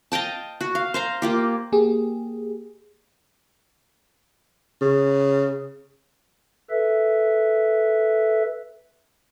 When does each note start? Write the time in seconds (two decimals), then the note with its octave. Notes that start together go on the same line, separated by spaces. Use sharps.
0.12 D#5 F5 G5 A5
0.61 F#4
0.75 F5
0.94 C5 F5 A#5
1.22 A#3 F4 G4
1.72 A#3 G4 G#4
4.81 C#3
6.70 A4 B4 E5